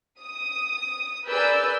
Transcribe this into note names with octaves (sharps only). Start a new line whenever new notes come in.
D#6
G#4 A#4 B4 D5 E6 G6